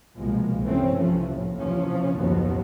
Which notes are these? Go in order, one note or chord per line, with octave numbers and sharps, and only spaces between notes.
C2 B2 F3 G#3 A#3
C2 G2 E3 A3 C4 C#4
C3 E3 F3 A3 C#4
D#2 A2
C3 E3 F3 C#4
F#1 D#2 A2 F3 F#3 B3